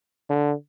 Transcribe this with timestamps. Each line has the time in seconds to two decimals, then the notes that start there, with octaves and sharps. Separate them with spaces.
0.30 D3